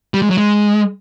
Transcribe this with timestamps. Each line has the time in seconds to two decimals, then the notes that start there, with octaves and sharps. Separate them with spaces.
0.14 G3
0.22 G#3
0.30 F#3
0.38 G#3